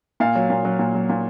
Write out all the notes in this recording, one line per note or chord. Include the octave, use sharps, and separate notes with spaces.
A#2 F5
F#3
A#2
F#3
A#2
F#3
A#2